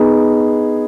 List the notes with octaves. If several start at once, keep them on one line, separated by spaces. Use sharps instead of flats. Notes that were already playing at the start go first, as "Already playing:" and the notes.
Already playing: B3 D#4 G#4